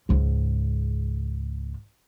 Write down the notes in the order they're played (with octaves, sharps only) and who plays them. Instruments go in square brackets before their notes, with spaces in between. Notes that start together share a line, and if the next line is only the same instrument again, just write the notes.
[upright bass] C#2 G#2